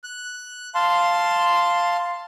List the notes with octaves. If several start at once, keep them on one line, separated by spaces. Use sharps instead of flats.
F#6
F5 A5 C6